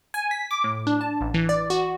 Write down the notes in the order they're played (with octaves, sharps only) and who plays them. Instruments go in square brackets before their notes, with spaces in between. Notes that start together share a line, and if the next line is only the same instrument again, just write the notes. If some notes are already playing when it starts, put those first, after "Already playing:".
[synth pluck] G#5
B6
D6
A2
D4
A5
A1
E3
D5
F#4